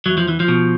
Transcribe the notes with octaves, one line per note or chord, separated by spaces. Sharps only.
E2 F#3
F3
E3
F3
B2